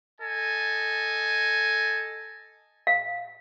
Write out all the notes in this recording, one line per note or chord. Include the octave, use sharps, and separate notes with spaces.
A4 D#5 G#5
F5